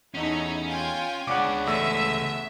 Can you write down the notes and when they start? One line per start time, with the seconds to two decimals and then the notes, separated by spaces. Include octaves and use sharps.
0.14 E2 A3 C#4 D#4 E4
0.67 F4 G5 G#5
1.27 C#2 C#3 B3 C#4 D4 G#4 F#5 D6
1.67 A1 A3 E5 E6